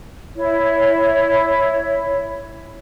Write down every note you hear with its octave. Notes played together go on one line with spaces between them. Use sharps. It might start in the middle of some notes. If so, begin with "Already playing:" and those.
E4 C#5